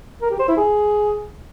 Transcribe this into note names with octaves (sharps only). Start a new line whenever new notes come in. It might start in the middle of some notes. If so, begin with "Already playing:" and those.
A#4
G4
C5
E4
G#4